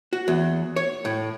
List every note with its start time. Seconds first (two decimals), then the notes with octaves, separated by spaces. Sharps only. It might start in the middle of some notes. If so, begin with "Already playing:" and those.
0.13 F#4
0.28 E2
0.76 C#5
1.05 A2